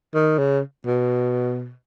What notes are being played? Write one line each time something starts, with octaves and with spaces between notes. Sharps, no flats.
D#3
C#3
B2